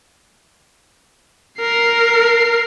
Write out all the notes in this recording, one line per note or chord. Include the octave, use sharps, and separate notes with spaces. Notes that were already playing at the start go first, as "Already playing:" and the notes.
A#4 C7